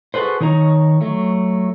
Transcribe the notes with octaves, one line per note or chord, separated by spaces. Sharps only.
F#4 G#4 A4 B4 C5
D#3 D#4 C#5 A#5
F#3 A3